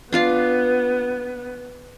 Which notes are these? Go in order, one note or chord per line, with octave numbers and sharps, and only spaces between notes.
B3 D4 F4 F5